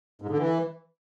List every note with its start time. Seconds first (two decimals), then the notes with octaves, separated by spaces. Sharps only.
0.22 G#2
0.30 D3
0.39 E3